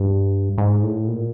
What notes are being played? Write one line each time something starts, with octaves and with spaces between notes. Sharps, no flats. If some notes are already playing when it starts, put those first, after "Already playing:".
Already playing: G2
G#2
A2
A#2